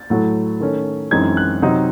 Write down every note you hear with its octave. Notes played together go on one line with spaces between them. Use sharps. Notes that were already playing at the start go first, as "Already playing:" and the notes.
Already playing: A6
A2 F#3 A3
D#3 A3 C#4
F#2 E3 G#3 C4 D#4 G#6
F#6
C3 F#3 C4 D#4